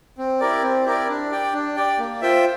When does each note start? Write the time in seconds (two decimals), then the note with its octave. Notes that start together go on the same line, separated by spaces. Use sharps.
0.18 C4
0.40 E4 G4 A#4 D5
0.62 C4
0.86 E4 G4 A#4 D5
1.09 D4
1.31 G4 D5 G5
1.53 D4
1.76 G4 D5 G5
1.99 A#3
2.22 F4 C5 E5 G5